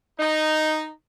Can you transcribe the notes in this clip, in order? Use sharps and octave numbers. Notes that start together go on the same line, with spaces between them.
D#4